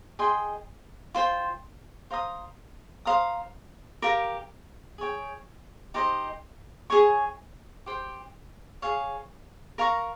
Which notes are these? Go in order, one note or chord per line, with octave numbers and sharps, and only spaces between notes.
G#4 D#5 G5 C6
F4 C5 G5
C5 F5 A#5 D#6
C5 F5 A#5 D#6
G4 A#4 F5 A#5
G#4 C#5 G5
D#4 G4 C5 D#5
G#4 C#5 G#5 C#6
G4 C5 G5
G#4 C#5 F5
A#4 F5 A#5 C#6